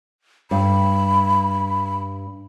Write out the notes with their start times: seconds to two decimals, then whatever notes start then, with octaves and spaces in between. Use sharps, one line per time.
0.51 G2 B5